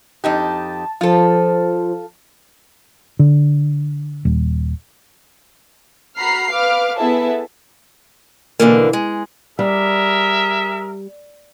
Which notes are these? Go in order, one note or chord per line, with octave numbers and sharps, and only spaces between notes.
F2 D#4 G4 A5
F3 F4 A4
D3
D#1
F#4 A#5 B5 F6 C7
B4 F5 D6 F6
B3 E4 G#4 A4 E5 A5
B2 D3 E3 A#3
G#3
G3 G#4 A#4 E5